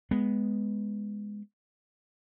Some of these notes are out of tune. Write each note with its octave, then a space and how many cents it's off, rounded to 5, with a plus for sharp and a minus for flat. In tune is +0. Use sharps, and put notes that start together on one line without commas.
G#3 +0 B3 +0